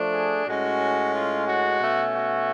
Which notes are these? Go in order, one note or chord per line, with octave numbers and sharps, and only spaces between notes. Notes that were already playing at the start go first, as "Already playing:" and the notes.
Already playing: F3 A3 D4
G#4
A2 G#3 C#4 F#4
F4
F#4
B2 A3 C#4
F#4